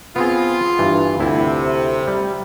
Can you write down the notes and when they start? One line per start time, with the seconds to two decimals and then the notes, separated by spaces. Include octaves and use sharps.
0.16 B3 C4 F4 G#4
0.79 G2 E3
1.20 D2 C3 E4
2.08 G3